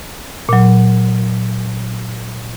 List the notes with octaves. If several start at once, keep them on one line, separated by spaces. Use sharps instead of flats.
A#2 F#3